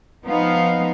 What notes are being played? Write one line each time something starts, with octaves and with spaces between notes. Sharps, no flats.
F3 B3 D#4 F5